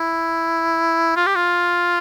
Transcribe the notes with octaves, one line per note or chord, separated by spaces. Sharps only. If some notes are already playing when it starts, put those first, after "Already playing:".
Already playing: E4
F4
G4
F4